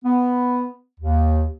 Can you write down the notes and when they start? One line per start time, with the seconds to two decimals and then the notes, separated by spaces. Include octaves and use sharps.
0.05 B3
0.99 D#2